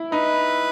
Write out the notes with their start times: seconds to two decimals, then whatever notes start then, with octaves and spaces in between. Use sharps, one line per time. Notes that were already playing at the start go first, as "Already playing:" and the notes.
Already playing: E4
0.12 D#4 B4